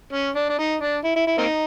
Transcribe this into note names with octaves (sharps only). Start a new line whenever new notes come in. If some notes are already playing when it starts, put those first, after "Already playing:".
C#4
D4
D4
D#4
D4
E4
E4
E4
A#3 C4 D#4